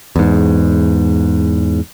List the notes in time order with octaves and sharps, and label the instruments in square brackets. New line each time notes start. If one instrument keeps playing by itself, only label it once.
[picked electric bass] E2 G#2